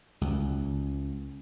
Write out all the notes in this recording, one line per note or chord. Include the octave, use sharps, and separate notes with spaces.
C#2